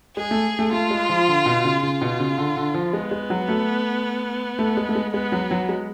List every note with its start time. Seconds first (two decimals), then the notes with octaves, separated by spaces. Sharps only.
0.17 G#3 G#4
0.31 A3
0.59 A3
0.72 A3 F4
0.91 G#3
1.09 F3
1.28 D3
1.46 B2
1.65 C#3
1.83 C#3 F4
2.01 B2
2.20 C#3
2.38 D3
2.57 D3
2.74 F3
2.93 G#3 B3
3.11 G#3
3.30 F#3
3.49 A3
4.59 A3
4.77 G#3
4.89 A3
4.95 G#3
5.14 G#3 B3
5.32 F#3
5.51 F#3
5.69 G#3